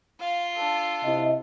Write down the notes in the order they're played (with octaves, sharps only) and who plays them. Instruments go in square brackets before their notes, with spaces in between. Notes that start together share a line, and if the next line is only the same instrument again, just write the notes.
[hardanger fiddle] F4 [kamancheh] F5
[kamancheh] D4 A4
[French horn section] C3 E4 D#5